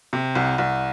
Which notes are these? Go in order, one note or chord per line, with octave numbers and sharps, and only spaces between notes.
C3
C2
C2